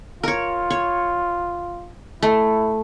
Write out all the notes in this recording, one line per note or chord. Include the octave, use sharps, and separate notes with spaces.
F4 A#4 C#5
C#5
A3 E4